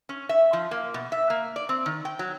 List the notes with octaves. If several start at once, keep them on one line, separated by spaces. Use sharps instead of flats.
C#4
E5
F3
A#3
B2
E5
A#3
D5
C4
D#3
G5
F#3